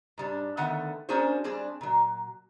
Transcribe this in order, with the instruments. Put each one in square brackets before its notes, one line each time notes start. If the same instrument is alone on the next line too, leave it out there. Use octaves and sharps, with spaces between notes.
[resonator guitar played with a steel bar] G#2 G3 D4
D3 D#3 A3 B3 F#5 G5
A#3 C#4 D4 F#4 G#4 C5
G3 C4 D4 G#4
A#2 F#3